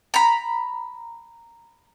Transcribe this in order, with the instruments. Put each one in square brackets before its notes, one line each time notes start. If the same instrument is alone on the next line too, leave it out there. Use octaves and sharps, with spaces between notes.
[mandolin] A#5 B5